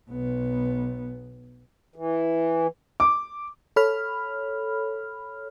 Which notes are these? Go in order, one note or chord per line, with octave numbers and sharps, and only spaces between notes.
B1 B3
E3
D6
A4 C#5 B5 F6